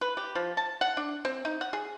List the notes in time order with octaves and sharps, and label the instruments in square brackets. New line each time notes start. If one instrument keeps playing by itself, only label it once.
[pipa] B4
G4
F3
A5
F#5
D4
C4
D#4
F#5
G#4